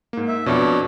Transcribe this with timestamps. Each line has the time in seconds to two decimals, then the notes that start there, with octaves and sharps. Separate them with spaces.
0.13 G#2 A#3
0.28 E5
0.46 F2 B2 D4 C#5